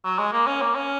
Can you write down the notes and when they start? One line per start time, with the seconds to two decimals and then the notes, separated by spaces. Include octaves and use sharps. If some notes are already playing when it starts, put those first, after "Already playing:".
0.05 F#3
0.18 G#3
0.33 A#3
0.47 C#4
0.61 A#3
0.75 C#4